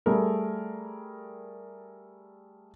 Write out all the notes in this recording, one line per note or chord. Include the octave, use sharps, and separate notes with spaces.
G3 A3 G#4 A#4